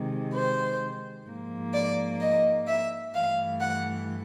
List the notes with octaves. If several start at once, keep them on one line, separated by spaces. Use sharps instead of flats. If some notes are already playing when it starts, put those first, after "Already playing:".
Already playing: C3 D#3 G#3
C5
G#2 F3 A#3
D5
D#5
E5
G2 E3 A3 F5
F#5